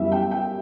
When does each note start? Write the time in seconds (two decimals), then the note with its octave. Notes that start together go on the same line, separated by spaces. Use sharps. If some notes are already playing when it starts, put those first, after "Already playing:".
Already playing: F#2 E3 G3 B3 E5
0.12 G5
0.31 G5